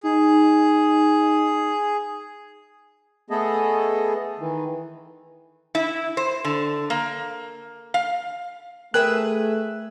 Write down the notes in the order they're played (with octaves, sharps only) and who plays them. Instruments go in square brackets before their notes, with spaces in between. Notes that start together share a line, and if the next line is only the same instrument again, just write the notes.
[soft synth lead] D#4 [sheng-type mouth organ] G#4
[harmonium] A3 B3 G#4 A4 D#5
D#3 E3
[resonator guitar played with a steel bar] E4
C5
D3
A#3
F5
[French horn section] A3 [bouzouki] G#4 B4 E5 [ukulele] A#4 G5 [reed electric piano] F#6